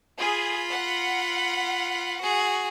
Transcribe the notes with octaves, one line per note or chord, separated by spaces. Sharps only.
F4 G#4 B5
F#5
F#4 G#4